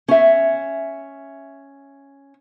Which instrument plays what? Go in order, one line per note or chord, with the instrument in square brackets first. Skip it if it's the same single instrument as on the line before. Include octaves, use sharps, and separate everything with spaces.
[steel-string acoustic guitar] C#4 E5